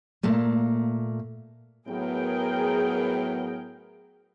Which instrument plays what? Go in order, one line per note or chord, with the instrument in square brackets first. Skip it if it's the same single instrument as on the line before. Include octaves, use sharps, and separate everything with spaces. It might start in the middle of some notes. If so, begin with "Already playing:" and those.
[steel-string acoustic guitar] A#2 A3 A#3
[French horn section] A2 F#3 B3 [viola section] G#4 A#4 G5